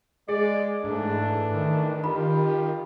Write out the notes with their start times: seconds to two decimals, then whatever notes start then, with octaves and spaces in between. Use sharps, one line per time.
0.29 G#3 G#4 D5
0.84 G#2 E3 A3 D4
1.54 D#3
2.04 F4 G4 B5